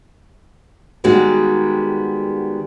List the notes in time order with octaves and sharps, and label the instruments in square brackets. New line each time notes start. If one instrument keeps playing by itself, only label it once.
[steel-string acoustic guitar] D#3 G3 G#3 B3 F#4 G4